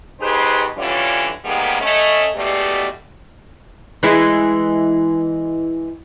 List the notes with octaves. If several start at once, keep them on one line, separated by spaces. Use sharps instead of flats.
B2 D#4 G4 G#4 B4 C5
D3 E3 G3 C#4 F4 C#5
C3 D#3 G3 G#3 A#3 B3
A3 C#4 D#5
E2 B2 G#3 A3 G4 D5
E3 G#3 E4